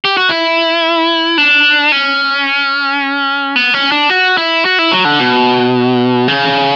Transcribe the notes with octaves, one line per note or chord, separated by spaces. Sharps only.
G4
F#4
E4
D4
C#4
B3
C#4
D4
F#4
E4
F#4
E4
F#3
D3
B2
C#3